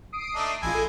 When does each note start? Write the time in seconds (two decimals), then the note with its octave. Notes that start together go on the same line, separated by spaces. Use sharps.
0.12 D#6 C7 D7
0.35 A3 D4 D#4
0.63 A1 G#3 E4 F4 G#5
0.74 A4